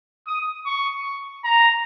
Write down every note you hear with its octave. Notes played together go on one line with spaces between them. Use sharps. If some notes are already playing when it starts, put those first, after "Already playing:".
D#6
C#6
A#5